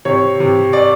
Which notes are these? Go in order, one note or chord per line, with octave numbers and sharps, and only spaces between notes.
C3 C#5
C3
D5